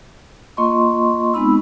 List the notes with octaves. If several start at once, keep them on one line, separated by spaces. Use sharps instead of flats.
A#3 F4 D#5 C6 C#6
G#3 B3 C4 D#4 B5 E6